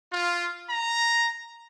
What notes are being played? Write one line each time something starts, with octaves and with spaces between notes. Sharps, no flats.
F4
A#5